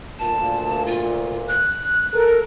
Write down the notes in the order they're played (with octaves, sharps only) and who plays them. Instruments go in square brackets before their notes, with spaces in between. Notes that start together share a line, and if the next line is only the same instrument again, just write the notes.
[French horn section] D2 A#2 [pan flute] A5
[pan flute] F4
F#6
[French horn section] A4 A#4